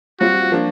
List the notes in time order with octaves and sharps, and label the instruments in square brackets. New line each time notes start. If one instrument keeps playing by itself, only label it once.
[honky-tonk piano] G3 C4 F4 [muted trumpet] F#4
[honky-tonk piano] F3 A#3 D4